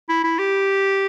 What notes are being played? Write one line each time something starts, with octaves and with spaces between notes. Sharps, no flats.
E4
E4
G4